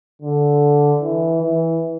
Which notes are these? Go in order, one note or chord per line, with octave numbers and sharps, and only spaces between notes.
D3
E3
E3